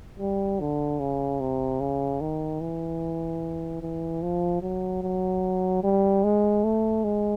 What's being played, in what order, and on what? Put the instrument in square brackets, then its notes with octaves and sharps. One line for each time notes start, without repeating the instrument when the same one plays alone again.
[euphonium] G3
D3
C#3
C3
C#3
D#3
E3
E3
F3
F#3
F#3
G3
G#3
A3
G#3